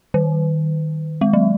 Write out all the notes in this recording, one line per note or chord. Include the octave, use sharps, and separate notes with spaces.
D#3
G#3
F#3